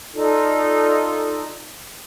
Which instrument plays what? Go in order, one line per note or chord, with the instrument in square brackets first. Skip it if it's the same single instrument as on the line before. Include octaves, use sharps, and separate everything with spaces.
[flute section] D#4 F4 A4 D5